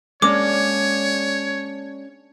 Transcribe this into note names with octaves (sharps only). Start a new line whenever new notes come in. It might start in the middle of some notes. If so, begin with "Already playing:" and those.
G#3 A#3 C#4 D4 C#5 D6